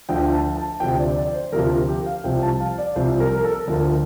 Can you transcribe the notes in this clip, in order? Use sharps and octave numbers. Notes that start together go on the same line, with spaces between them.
D2 D3 F3 G5
A5
A5
D2 C3 F3 G5
D5
D5
C5
D2 C3 F3 A#4
G4
F5
C2 C3 F3 G5
A5
F5
D5
C2 C3 F3 C5
A#4
A#4
A4
D2 D3 F3 A#4